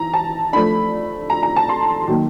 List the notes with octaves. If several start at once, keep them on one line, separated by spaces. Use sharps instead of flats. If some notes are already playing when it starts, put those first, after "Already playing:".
Already playing: E3 A#5
A5
F3 A3 D4 B5
A#5
A#5
A5
C6
D#3 F#3 A#3